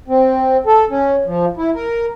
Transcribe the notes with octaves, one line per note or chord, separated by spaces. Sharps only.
C4
A4
C#4
F3
E4
A#4